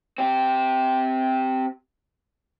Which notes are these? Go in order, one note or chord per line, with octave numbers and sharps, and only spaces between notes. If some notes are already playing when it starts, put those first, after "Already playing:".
C4 G4